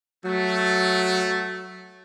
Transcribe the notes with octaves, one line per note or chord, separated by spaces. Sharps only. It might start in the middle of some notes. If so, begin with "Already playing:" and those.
F#3 A3